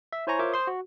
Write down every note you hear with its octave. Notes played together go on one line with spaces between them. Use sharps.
E5
E4 C5 C#5 G#5 A#5 C#6
F4 A#4 C5 C#5 E5 D6
C5 C6 D#6
F#4